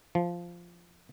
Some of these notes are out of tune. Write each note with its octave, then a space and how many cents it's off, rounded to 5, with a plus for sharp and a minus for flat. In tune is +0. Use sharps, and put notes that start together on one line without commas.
F3 -5